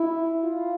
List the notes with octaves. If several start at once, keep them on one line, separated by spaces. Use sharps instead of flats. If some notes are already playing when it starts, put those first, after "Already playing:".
Already playing: E4
F4